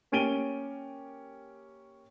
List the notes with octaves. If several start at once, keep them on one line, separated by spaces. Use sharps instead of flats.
A#3 C#4 G4 D7 D#7 G7